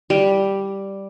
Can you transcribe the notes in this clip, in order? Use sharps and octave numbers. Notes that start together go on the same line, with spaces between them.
G3